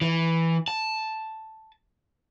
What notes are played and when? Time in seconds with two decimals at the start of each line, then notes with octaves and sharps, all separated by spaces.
0.01 E3
0.68 A5